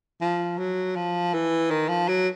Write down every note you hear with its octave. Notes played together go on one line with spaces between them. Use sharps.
F3
F#3
F3
E3
D#3
F3
F#3